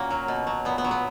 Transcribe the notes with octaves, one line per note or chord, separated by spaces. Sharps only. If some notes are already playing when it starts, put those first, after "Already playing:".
Already playing: A#2 A#3 C#4 F#4
F#3
B2
F#3
A#2 B3
B3
F#3
B3